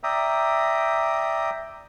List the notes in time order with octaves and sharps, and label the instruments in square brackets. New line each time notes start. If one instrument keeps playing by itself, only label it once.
[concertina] D5 E5 G5 A#5 D#6